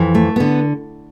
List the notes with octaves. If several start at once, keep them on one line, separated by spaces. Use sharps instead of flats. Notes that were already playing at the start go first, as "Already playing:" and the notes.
Already playing: F2 E3
A3
D3 B3